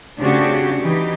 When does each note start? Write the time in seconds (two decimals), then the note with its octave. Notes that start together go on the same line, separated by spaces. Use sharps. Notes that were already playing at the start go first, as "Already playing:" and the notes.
0.19 C#3 A3 C4 D4 F#4 G4
0.81 E3 D#4 G4